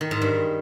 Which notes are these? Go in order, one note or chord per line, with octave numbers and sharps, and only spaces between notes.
D#3
G#2
G2